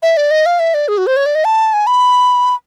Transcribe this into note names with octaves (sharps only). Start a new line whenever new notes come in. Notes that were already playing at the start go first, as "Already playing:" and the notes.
E5
D5
D#5
F5
E5
D5
G#4
F#4
C5
C#5
D5
D#5
A5
G#5
B5